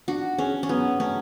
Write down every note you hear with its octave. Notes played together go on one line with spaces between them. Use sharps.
D4 F#4
C#4 G#4
C#4
F#3 B3
A3 C#4